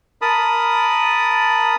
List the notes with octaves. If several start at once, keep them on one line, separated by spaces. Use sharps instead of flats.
A#4 A5 B5 D#6